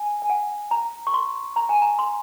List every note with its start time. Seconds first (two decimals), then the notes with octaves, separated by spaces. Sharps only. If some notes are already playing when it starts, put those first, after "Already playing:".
Already playing: G#5
0.22 G#5
0.30 F#5
0.71 A#5
1.07 C#6
1.14 C6
1.56 A#5
1.69 G#5
1.82 A#5
1.99 C6